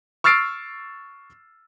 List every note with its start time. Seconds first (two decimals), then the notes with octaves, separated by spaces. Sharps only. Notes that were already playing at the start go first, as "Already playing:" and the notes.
0.24 C#6 E6 F6 A6 C7 D7